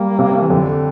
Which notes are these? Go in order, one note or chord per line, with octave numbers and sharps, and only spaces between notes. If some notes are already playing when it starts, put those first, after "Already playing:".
Already playing: G3 A#3
C3
E3
F2 D3